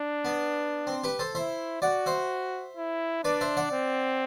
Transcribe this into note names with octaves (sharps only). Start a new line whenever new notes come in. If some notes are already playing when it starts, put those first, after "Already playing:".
Already playing: D4
B3
C4
G4 B4
A4 C5
E4 C5 E5
F#4 D5 F#5
C5 E5
E4
D4 B4 D5
C5 E5
D5 F#5
C4